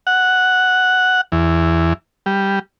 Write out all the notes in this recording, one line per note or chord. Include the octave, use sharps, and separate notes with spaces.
F#5
E2
G3